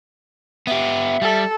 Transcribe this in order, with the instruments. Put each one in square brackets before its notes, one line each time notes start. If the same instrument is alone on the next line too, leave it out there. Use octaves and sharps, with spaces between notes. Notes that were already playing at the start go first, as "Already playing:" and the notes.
[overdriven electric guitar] B3 G4 [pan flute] E5
[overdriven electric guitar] G3 [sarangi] A4